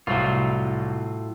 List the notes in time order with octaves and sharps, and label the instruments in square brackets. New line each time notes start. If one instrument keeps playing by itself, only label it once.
[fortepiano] C2 [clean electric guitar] A2 F#3 F4